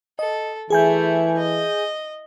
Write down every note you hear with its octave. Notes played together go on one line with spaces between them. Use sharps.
A4 D#5
E3 A3 E4 G#4 G#5 G6
D#5